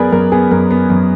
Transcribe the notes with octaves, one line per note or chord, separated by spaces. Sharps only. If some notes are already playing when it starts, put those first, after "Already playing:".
Already playing: F#2 B3 G#4 A#4 B4 D5
F#2 A#4
B3 G#4
F#2 A#4
B3
F#2